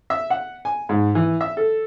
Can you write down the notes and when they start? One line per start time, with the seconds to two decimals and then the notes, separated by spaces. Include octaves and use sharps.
0.10 E5
0.30 F#5
0.65 G#5
0.89 G#2
1.15 E3
1.41 E5
1.57 A4